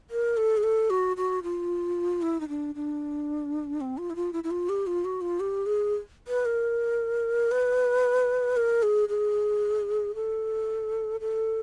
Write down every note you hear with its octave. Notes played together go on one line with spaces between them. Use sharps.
A#4
A4
G#4
A4
F#4
F#4
F4
E4
D#4
D4
D4
C4
F4
E4
F4
E4
E4
F4
G4
F4
F#4
F4
G4
G#4
B4
A#4
B4
A#4
G#4
G#4
A4
A4